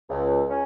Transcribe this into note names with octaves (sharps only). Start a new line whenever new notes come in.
C#2
C#4